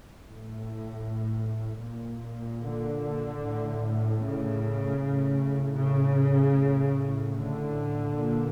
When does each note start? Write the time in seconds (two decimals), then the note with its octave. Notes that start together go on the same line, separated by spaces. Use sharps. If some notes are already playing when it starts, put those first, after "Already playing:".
0.24 A2
1.82 A#2
2.60 D3
3.39 A2
4.18 C#3
4.97 A2
5.76 C#3
6.55 A2
7.34 D3
8.12 A#2